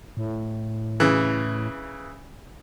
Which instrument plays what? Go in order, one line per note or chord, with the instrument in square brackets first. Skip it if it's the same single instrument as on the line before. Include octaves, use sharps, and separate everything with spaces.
[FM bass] A2
[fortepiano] C#3 E3